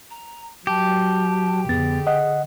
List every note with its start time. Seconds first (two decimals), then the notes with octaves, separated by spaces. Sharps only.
0.10 A#5
0.67 F#3 G4 A5
1.69 F2 D3 B3 G#4 A6
2.07 D#5 F#5